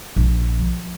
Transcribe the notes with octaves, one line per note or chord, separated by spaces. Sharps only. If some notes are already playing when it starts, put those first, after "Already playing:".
A#1
F3